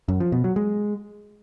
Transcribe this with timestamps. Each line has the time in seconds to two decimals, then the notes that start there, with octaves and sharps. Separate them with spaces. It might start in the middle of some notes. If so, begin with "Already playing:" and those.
0.08 F#2
0.20 F3
0.32 B2
0.44 F#3
0.56 G#3